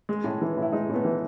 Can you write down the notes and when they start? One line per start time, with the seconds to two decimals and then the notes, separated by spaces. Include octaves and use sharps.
0.09 G#3
0.24 A2
0.41 E3
0.57 A2
0.62 E4
0.72 G#3 D#4
0.89 A2
0.95 B3
1.05 E3